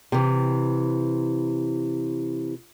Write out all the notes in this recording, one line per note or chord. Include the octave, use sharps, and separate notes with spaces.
C3 E3